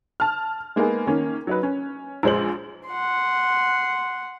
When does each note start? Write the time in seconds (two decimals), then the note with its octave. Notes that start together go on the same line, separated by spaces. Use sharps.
0.20 A5 F6
0.76 G#3 A#3 B3 D#4 G#4
1.07 D#3 A#3 C#4
1.47 F#3 D#4 B4
1.63 C#4
2.23 A#1 G#3 C5 F#7
2.87 F#5 C6